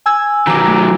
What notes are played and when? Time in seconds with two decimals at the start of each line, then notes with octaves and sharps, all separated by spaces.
0.06 G#5 E6 G#6
0.47 D#3 F#3 A#5 D6
0.67 A3